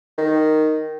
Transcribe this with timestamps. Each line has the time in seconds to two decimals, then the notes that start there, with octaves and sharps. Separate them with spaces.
0.18 D#3